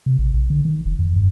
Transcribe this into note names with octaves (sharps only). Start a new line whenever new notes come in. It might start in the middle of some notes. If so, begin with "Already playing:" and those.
C3
A1
A#1
D3
D#3
F1
F2
G2